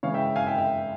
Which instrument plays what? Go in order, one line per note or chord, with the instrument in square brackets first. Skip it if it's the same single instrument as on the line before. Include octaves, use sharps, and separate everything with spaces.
[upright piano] C#3 E3 G#3 C#5 F5
E5 G5
F5 G#5
E5 G5
E5 G5